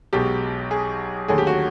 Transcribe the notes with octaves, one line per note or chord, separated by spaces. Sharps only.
B1 B2 G#3 G4
G#4
D#2 D3 F#3 A3 G#4
G4
F#4